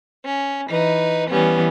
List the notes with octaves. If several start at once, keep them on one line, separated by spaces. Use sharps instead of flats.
C#4
E3 D#4 B4
E3 G3 B3 C#4